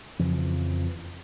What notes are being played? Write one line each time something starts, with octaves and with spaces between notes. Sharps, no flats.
F2 C#3 E3 F3